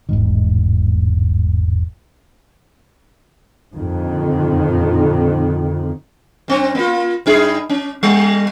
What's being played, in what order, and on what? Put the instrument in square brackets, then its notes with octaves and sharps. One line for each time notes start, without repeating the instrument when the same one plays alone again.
[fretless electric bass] E1 A1 G#2 D#3
[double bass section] F2 A#2 D3 D#3
[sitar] G2 C4
A#3 F4
G2 D#4 G#4
C#4
G3